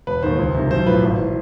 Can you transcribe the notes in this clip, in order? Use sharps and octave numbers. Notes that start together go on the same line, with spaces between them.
E1 B4
D#2 D#3 C5
C#2
C3 D#3
B1 C5
A2 F3 B4
G#1
E3